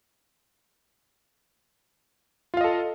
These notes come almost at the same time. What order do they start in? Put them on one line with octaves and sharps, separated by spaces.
F4 F5 D#5 A4